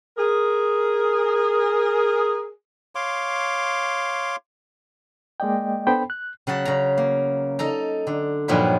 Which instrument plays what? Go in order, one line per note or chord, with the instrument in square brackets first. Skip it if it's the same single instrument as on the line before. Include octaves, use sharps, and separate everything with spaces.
[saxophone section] G#4 A#4
[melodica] C#5 F5 C6 D6
[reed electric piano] G#3 A#3 D5 D#5 G5
B3 D4 A4 C5 G5 B5
F#6
[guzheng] C#3 F#3 F#5 A5
C#3 A#5
A#3
D#4 A4 A#5
D3
G2 A#2 F3 F#3 D#4 B5